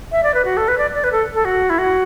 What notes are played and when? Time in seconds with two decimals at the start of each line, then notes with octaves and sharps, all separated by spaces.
0.12 E5
0.23 D5
0.34 B4
0.45 F#4
0.57 A4
0.68 B4
0.78 D5
0.95 D5
1.04 B4
1.12 A4
1.34 A4
1.45 F#4
1.70 E4
1.78 F#4